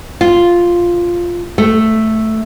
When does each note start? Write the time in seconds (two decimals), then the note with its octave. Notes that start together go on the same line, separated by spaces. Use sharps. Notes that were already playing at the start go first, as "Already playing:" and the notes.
0.21 F4
1.58 A3